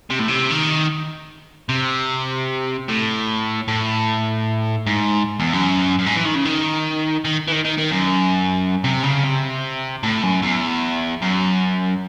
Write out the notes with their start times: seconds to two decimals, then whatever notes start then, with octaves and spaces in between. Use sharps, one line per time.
0.10 C3
0.19 A2
0.28 C3
0.50 D#3
1.69 C3
2.88 A2
3.68 A2
4.87 G#2
5.40 E2
5.53 F#2
5.99 F#2
6.06 G#2
6.16 E3
6.26 D#3
6.35 C#3
6.45 D#3
7.25 D#3
7.48 E3
7.52 D#3
7.65 D#3
7.78 D#3
7.91 F#2
8.84 C3
9.03 C#3
9.24 C3
10.03 A2
10.23 F#2
10.42 E2
11.22 F#2